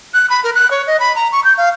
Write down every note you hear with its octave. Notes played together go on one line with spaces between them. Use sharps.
F#6
B5
A#4
F#6
C#5
D#5
B5
A#5
C#6
G6
F5